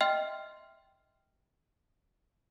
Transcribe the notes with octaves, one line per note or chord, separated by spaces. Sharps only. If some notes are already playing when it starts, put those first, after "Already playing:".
D#5 E5 G5 C6 F6